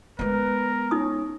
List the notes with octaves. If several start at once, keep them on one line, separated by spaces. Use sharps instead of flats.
G#3 B3 A#4 B4
C#4 D#4 D#6